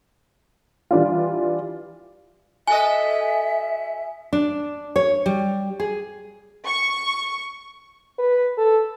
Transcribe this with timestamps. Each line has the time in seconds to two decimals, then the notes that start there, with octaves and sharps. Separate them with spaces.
0.91 E3 G3 D4 F4
2.67 F#4 A4 D#5 E5 G#5
4.33 D4
4.96 C#5
5.26 G3
5.80 G#4
6.65 C#6
8.19 B4
8.58 A4